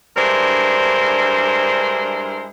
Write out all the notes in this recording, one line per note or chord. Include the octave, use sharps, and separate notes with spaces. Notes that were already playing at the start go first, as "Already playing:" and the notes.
G2 G#3 D4 E4 A#4 C5